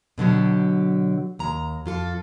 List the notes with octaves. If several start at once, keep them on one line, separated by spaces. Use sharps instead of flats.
B2 D3 F#3 G4
D#2 A#5
F2 F4 A4